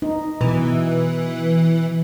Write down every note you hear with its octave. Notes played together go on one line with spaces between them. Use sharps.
D#4
B2 E3